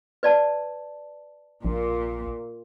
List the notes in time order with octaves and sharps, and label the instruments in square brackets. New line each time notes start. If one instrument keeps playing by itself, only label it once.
[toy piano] B4 D5 A5
[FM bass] A#1 [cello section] A#2